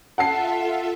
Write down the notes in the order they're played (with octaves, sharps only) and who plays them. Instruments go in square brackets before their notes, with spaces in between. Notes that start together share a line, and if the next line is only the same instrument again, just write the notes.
[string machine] F4 A4 E5 [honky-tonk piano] F#5 A5 C7